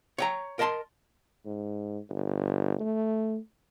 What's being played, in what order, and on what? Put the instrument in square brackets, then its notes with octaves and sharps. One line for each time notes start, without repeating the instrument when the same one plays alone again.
[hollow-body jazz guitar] C#5 G5 A#5
A#4 D#5 A5 B5 C6
[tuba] G#2
G1
A3